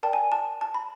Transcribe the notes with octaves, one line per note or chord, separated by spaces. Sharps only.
A#4 D5 G5 A5
G#5
A5
A5
B5